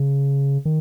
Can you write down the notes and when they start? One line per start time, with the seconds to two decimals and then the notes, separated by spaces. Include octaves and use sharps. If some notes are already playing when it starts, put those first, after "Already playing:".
Already playing: C#3
0.65 D#3